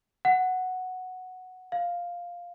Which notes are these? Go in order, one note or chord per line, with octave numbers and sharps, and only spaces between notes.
F#5
F5